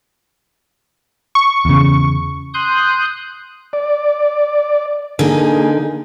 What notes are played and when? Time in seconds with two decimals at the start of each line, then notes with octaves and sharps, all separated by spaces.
1.35 C#6
1.65 E2 C#3
2.54 C6 D#6 F#6 G6
3.73 D5
5.19 D3 A#3 D#4 G#4